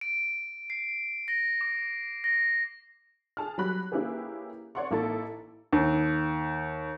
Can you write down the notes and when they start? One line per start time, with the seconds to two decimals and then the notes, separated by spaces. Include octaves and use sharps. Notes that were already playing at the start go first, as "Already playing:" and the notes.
0.01 D7
0.70 C7
1.28 A#6
1.61 D6
2.24 A#6
3.37 G#4 A5 F6
3.58 F#3 G3 B5 F#6
3.92 A#3 C#4 E4 G4 G#4 B4
4.75 C#5 D5 F#5 C6 C#6
4.91 A1 A#3 D#4 E4 A4 A6
5.72 D#2